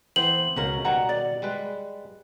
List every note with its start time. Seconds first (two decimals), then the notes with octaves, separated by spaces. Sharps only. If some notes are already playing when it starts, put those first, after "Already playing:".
0.16 E3 B3 C4 C5 F#7
0.56 C#2 B2 C#4 A#4 F5
0.85 B2 D#3 G3 F#4 F#5 A#5
1.09 D5
1.42 G3 G#3 B4